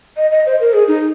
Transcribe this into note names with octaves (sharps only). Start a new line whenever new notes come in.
D#5
D#5
C5
A#4
G#4
D#4